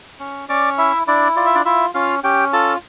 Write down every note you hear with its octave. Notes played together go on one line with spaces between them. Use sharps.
C#4
C#4 D5 D6
E4 E5
D4 E4 D5
F4 D5
E5
D4 D5
E4 F4 E5
C#4 F4 F5
C#4 G4 G5
F4 A4 A5